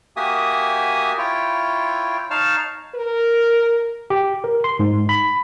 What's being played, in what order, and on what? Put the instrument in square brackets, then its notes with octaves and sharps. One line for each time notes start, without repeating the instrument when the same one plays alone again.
[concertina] A#3 F#4 G4 E5 G#5 D#6
E4 F4 C#5 G5
D#4 C#5 F5 A5 F6
[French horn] A#4
[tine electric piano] G4
A#4
C6
G#2
B5